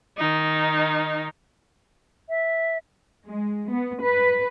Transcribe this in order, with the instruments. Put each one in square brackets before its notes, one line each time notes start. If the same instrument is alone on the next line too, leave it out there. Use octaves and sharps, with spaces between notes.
[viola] D#3 D#4
[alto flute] E5
[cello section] G#3
B3
B4